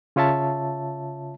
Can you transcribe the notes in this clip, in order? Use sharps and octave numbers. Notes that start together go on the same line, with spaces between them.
C#3 F4 C#5 E5 A5